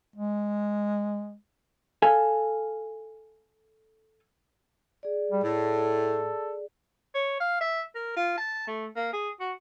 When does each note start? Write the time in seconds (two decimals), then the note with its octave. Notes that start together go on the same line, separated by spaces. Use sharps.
0.16 G#3
2.02 A4 F5 G#5
5.03 G#4 D5
5.32 G3
5.44 A2 A4
7.15 C#5
7.40 F5
7.61 E5
7.95 A#4
8.16 F4
8.38 A5
8.67 A3
8.96 A#3
9.13 G#4
9.40 F#4